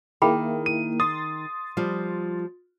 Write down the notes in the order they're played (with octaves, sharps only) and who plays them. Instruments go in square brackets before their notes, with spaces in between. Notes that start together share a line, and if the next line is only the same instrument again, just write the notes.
[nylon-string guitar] D#3 [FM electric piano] A#3 E4 [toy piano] G#4 G5 B5
[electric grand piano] D#7
[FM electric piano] C6 A6 [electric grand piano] D#6
[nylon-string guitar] F3 G3 F4